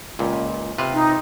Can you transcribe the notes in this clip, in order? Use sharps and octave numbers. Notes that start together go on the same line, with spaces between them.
C#2 A#2
C3 F4 B4
D#4